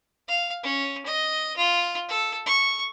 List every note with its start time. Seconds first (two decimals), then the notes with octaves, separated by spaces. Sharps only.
0.28 F5
0.64 C#4
1.06 D#5
1.57 F4
2.09 A4
2.46 C#6